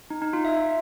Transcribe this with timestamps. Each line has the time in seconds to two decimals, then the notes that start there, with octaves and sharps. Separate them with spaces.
0.10 D#4
0.22 D#4
0.33 F4
0.45 E5